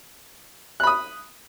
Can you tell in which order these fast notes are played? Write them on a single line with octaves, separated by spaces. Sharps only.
F#6 B5 D#6